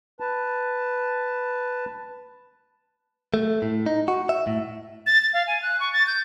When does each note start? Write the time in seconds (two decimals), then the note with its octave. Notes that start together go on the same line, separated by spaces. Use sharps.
0.20 B4 A5
3.34 A3
3.62 A2
3.86 D#4
4.08 F#4
4.29 E5
4.47 A2
5.06 A6
5.22 A6
5.34 F5
5.47 G#5
5.62 F#6
5.80 C#6
5.93 A6
6.07 G6